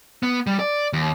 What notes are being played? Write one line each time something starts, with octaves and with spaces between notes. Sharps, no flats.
B3
G3
D5
D#2